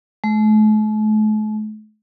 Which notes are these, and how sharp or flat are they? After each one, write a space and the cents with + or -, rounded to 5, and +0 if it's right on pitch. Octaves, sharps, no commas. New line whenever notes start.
A3 -45